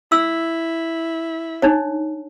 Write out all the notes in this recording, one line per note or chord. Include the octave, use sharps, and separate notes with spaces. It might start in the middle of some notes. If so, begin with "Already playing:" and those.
E4 E6
D4 D#4 C#5